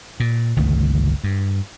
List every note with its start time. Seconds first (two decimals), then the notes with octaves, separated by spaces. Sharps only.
0.20 A#2
0.56 G1 C#2 D#3 A3
1.24 G2